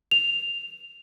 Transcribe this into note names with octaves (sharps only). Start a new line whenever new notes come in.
F7